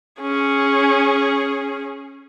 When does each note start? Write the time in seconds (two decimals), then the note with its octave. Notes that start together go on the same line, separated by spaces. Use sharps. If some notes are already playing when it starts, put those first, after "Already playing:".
0.21 C#4 G#4